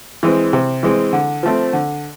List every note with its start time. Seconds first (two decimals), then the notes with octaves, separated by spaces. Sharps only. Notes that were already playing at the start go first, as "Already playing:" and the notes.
0.23 E3 G#3 C4
0.53 C3
0.83 E3 G#3 C4
1.13 D3
1.43 F3 A3 C4
1.73 D3